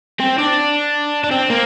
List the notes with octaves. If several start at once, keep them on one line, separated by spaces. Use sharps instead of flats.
C4
D4
D4
C4
A#3